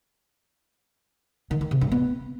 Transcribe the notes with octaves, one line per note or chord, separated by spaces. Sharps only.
D#3
D#3
C3
G2
B3